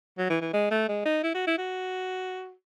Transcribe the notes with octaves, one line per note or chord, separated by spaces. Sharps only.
F#3
E3
E3
G#3
A3
G#3
D#4
E4
F#4
E4
F#4